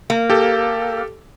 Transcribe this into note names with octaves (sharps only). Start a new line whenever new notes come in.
A#3
G4 A4